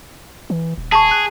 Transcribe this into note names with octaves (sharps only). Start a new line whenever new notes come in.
E3
D#1
G#4 A5 C#6
F#6